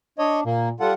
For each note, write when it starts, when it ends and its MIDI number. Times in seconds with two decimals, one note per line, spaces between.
0.19 0.45 62
0.19 0.40 73
0.19 0.40 75
0.45 0.74 46
0.45 0.69 58
0.80 0.93 55
0.80 0.93 65
0.80 0.91 69
0.80 0.93 78